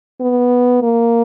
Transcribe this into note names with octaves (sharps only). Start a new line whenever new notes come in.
B3
A#3